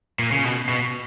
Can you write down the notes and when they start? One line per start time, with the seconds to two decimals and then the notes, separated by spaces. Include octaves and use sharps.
0.19 A#2
0.32 C#3
0.45 B2
0.69 B2